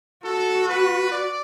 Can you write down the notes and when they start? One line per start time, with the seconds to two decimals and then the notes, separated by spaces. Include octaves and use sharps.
0.24 F#4 A4
0.69 B4
1.12 D5